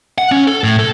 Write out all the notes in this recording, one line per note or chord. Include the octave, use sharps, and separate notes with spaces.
F#5
C#4
A4
A2
A4